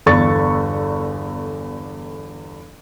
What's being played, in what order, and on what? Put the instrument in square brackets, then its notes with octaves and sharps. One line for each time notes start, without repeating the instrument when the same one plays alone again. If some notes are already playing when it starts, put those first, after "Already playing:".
[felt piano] G1 E2 A4 D5 C#6 A6